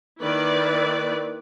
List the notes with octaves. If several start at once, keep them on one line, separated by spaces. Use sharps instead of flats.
D#3 A#3 E4 B4 D5